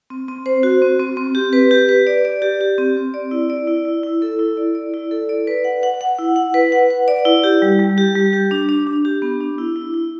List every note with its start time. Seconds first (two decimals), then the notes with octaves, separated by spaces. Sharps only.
0.10 C4
0.28 C4
0.46 C5
0.63 F#4
0.82 C4
1.00 C4
1.17 C4
1.35 G4
1.53 B4
1.71 G4
1.89 B4
2.07 D5
2.25 D5
2.42 G4
2.61 G4
2.78 C4
2.97 C4
3.14 D5
3.31 E4
3.50 D5
3.67 E4
3.85 E4
4.03 E4
4.22 A4
4.39 E4
4.57 D5
4.75 D5
4.94 E4
5.11 A4
5.29 D5
5.47 B4
5.64 F#5
5.83 F#5
6.01 F#5
6.19 E4
6.36 F#5
6.54 B4
6.72 F#5
6.91 B4
7.08 D5
7.25 E4
7.44 G4
7.62 G3
7.79 G3
7.98 G4
8.15 G3
8.33 G4
8.51 D4
8.69 D4
8.87 D4
9.05 G4
9.22 B3
9.41 D4
9.58 E4
9.76 E4
9.94 E4